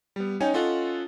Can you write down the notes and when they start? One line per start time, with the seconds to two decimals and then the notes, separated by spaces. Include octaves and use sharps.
0.16 G3 B3
0.40 C#4 D#4 C#5 G5 G#5
0.54 C#4 F4 A4 D#5 F#5